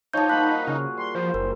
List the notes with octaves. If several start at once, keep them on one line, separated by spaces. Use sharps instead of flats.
F3 D#4 G4 C#5 A5 G6
A#2 G3 F#4 B5 F#6
C#3 F#4 G#4 A#4
G3 C6
F3 C5
F#1 A#4